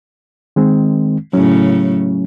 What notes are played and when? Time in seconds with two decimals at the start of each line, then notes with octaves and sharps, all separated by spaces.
0.56 D#3 G#3 C4
1.33 A2 C#3 F#3 C#4